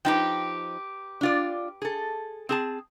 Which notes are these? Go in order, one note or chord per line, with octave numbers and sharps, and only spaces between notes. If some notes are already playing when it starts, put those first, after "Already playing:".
F3 D#4 G4 B4 G5
D4 F4 D5
G#4 A4
C4 G#4 A5